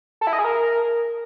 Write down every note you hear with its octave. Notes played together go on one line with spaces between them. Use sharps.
A4
E4
D#5
G#4
A#4